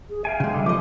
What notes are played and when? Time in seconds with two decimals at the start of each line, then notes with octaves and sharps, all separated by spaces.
0.10 G#4
0.25 E5 F5 G5 G#5
0.40 C#3 G#3
0.54 D3 G3
0.66 C#3 F3 G4 D#5 D6